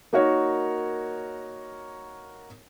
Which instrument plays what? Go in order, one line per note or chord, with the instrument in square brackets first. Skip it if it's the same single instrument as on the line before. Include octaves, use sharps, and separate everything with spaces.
[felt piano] A#3 D#4 F#4 A#4 C#5